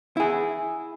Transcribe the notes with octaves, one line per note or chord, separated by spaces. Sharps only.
E4 G#4